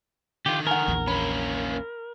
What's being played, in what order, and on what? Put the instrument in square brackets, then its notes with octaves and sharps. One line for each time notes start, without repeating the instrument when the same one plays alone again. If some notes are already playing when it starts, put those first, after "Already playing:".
[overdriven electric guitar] D3 D#3 [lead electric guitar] F4 G4
[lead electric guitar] A#4 [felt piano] F#5 G#5
[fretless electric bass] A#1 E2
[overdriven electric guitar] A#3 C#4 [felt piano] B5